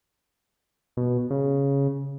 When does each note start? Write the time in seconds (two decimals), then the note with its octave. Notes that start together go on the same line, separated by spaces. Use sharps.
0.97 B2
1.31 C#3